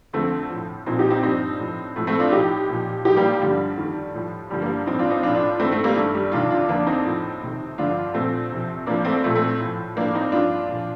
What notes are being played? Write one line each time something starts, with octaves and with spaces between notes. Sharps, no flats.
F2 D3 F3 A3 C4
A2 F3
A#2 F3 C4 D#4
D#4 G4
C4 D#4
G2 F3 C4 D#4
A2 F3
A2 F3 A3
A3 C4
D4 F4
A2 F3 D#4 G4
A#2 F3
A2 F3 D#4 G4
G3 A#3
G3
G2 D3 F3 G3
F2 D#3
A2 F3
G2 D3 F3 G3
G3 A#3
A2 F3 C4 D#4
D4 F4
C4 D#4
F3 D4 F4
A2
D4 F4
G2 D#3 A3 C4
A3 C4
G3 A#3
G2 D#3 A3
G3
F2 C3 D#3 D4 F4
D4 F4
F2 D3 F3 A#3 D4
C4 D#4
A2 F3
F2 C3 D#3
G2 D3 F3 D4 F4
A#2 F3 A3 C4
F2 C3 F3
A2 F3 A#3 D4
A3 C4
A#2 F3 A3
A3 C4
A2 F3
A2 F3 A#3 D4
C4 D#4
G2 F3 D4 F4
A#2 F3